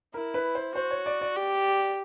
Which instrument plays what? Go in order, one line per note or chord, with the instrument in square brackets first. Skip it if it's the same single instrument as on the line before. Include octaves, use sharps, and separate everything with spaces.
[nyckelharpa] E4 [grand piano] A#4
[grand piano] B4
C5
[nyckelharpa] F#4 [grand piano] C5
[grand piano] C#5
D5
D5
[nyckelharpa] G4